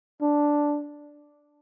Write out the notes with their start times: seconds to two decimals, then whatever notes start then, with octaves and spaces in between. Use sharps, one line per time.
0.22 D4